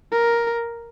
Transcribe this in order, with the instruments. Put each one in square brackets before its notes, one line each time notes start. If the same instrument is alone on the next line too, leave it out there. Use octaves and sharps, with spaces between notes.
[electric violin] A#4